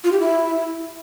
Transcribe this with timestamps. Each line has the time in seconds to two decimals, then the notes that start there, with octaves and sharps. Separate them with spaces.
0.04 F4
0.12 G4
0.20 E4